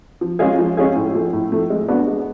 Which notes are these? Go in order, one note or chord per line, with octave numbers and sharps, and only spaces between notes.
F3
G#3 C#4 F4 G#4
F3
G#3 C#4 F4 G#4
A2
F3 A3
A2
F3 A3
G#3
B3 D4 F#4
G#3